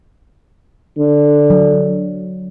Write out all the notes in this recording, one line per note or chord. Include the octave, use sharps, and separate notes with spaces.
D3
F#3